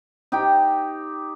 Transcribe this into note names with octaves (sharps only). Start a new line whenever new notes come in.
D#4 G4 G5